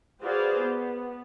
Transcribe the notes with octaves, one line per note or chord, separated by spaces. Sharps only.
F#4 G#4 B4 C5 D5 F5
B3